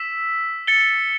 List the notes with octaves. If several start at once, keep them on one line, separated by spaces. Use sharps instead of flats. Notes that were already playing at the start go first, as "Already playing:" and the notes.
Already playing: E6 B6 E7
A6 C#7 G7